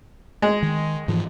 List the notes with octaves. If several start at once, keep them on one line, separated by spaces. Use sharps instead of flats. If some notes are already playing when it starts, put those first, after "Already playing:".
G#3
D#3
G#2 E3 F3